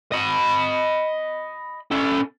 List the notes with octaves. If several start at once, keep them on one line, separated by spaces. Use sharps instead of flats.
D#5 B5
C#4 A4